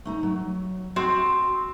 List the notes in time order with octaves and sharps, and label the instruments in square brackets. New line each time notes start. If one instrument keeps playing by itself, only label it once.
[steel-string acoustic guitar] A3 D#4 A#5
F#3
[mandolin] C4 [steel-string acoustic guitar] F#4